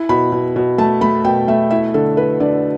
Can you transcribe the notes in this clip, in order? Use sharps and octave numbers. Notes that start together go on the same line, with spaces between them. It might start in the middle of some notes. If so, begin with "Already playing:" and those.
Already playing: E4
B2 B5
B2
B2
A3 A5
A3 B5
B2 G5
A3 E5
E4 E5
D3 A4
E4 B4
D3 D5